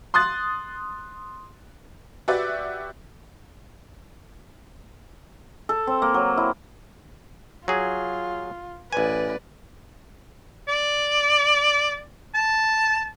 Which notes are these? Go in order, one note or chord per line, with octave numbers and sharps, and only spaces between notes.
C6 D#6 F#6 A6
F#4 G4 B4 D5 E5
A4
C4
A#3
F#3
E4
F#3 F4 G#4
A1 B4 D5 G#5
D5
A5